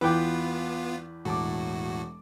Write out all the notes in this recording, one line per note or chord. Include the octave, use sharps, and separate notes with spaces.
E2 B3 F4 B4 G5 B5 D6
E1 A2 F#4 A5 D6